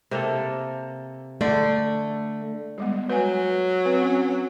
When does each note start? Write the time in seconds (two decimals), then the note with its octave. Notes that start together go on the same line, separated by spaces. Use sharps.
0.11 C3 A#3 A4
1.41 D3 A3 D5
2.78 G3 G#3 B3
3.10 F#3 B4 G#5
3.85 C4 B4
4.00 C4 C#4